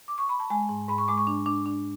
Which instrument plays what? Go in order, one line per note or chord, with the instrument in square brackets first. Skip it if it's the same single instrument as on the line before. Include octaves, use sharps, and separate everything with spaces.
[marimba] D6
C#6
B5
A5
G#3 G#5
G#2
G#2 B5
C#6
G#3 D6
C#6
D4
D4
D4